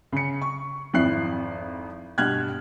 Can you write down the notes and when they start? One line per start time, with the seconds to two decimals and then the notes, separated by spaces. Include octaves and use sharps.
0.12 C#3 C#7
0.42 C#6
0.93 G#1 F2 E4 F#6 C7
2.18 G2 B2 F6 F#6 G#6